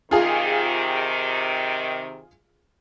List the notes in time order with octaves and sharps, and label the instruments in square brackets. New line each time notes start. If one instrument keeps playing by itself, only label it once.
[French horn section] C3 D#3 [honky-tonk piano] F4 G#4 F5